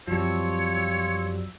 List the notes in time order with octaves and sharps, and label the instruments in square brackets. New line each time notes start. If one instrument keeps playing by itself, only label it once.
[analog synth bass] F#2 [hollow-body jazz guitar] F3 G3 C4 [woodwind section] F4 E6 [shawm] C#5